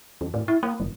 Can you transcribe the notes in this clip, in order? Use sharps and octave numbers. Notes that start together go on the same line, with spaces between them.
E2
A2
E4
A#3
F#1